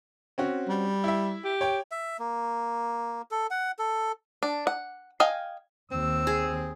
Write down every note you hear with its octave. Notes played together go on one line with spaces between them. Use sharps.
C4 C#4 F#4
G3
E4 E5
G4
C#5 G5
E5
A#3
A4
F#5
A4
D4
F#5
D#5 F5 G5 G#5
D#2 C4 E6
G#4